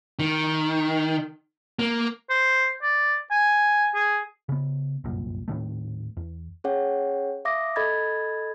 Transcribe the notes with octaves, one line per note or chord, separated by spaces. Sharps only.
D#3
A#3
C5
D5
G#5
G#4
C#3 B3
G1 C2 F#2 A#2
D#1 A2 D#3 A3
E2
C#4 G#4 C#5 F#5 G5
E5 F5 D6 D#6 A#6
A4 D#5 B5 G#6 A6